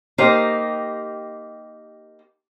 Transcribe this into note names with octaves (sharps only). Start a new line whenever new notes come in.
A#3 D#4 G4 C5